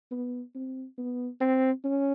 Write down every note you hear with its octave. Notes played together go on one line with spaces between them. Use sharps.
B3
C4
B3
C4
C#4